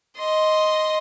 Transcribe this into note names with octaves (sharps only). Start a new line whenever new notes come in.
D#5 C6